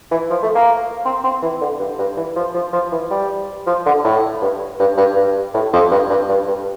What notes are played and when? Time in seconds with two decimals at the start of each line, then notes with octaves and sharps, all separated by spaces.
0.11 E3
0.30 F3
0.43 A3
0.55 A#3
1.05 C4
1.24 C4
1.42 E3
1.61 D3
1.79 G2
1.99 G2
2.17 E3
2.36 F3
2.54 F3
2.73 F3
2.92 E3
3.11 G3
3.66 F3
3.86 D3
4.04 A2
4.42 G2
4.80 G2
4.97 G2
5.16 G2
5.54 A2
5.73 F2
5.91 G2
6.10 G2
6.29 G2
6.48 G2